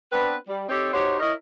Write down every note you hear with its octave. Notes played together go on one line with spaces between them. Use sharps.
B3 C4 D4 B4
G3
C4 D#4 G4 A4 C5 C#5
D#4 F#4 G4 C5 C#5
E4 A#4 C#5 D#5